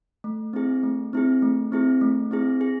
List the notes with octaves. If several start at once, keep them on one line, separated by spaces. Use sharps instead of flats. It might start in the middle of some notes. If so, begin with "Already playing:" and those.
A3
C4 E4 G#4
A3
C4 E4 G#4
A3
C4 E4 G#4
A3
C4 E4 G#4
G#4